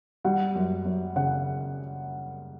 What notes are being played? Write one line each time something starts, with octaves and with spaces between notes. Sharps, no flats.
G3 F#5
F#2
F#2
C#3 F#5